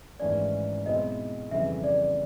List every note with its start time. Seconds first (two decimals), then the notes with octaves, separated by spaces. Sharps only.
0.19 G#1 G#2 E3 A3 C#4 D5
0.85 B1 B2 G#3 C4 E4 D#5
1.51 F2 C#3 E3 G3 E5
1.84 D5